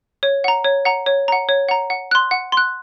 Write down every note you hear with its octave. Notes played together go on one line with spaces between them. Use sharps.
C#5
F#5 A#5
C#5
F#5 A#5
C#5
F#5 A#5
C#5
F#5 A#5
F#5
C6 F#6
F#5
C6 F#6